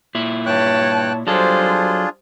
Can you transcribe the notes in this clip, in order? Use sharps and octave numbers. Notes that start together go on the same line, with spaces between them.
A#2 E4
G2 C#5 G5 A5 F#6
F#3 G3 D4 F4 G#4 A4 C5